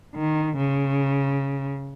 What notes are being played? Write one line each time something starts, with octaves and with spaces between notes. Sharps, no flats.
D#3
C#3